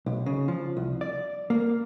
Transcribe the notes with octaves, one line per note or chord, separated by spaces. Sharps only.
B1
C#3
F3
C2
D5
A#3